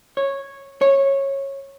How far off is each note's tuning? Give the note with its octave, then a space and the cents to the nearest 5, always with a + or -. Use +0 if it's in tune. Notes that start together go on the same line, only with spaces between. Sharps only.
C#5 -10
C#5 -15